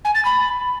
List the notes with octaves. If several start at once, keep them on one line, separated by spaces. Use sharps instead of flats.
G#5
A6
B5